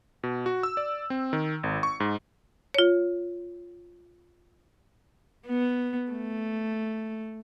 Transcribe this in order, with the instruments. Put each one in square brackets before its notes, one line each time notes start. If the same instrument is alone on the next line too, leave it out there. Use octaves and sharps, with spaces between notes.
[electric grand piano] B2
F#4
E6
D5
C4
D#3
G#1
C#6
G#2
[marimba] F4 C#5
[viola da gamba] B3
A3